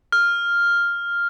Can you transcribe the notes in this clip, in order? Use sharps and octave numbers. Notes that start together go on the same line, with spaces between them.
F6